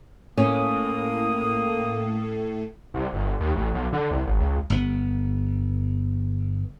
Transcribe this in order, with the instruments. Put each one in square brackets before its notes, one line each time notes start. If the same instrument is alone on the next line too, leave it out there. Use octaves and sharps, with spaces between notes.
[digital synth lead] A2 [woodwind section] A#3 D#6 [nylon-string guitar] C#4
[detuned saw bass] C2
G1
D#2
A1
B1
D3
C2
G#1
C#2
[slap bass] G1 B3